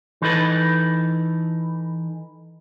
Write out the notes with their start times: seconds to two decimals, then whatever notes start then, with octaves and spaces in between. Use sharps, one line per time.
0.22 E3 D#4 A4 B4